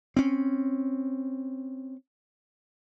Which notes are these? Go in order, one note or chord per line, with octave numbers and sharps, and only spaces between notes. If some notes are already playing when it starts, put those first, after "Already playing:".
C4 C#4